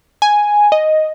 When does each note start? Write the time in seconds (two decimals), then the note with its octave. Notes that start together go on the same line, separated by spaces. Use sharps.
0.22 G#5
0.72 D#5